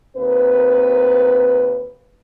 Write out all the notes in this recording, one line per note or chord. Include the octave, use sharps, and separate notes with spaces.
D#2 C4 A#4 B4